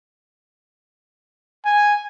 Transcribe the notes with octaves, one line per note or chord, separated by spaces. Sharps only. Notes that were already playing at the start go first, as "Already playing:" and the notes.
G#5